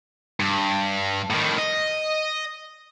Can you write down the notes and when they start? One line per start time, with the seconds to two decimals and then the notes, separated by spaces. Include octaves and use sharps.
0.40 G2
1.30 A2 D#3
1.59 D#5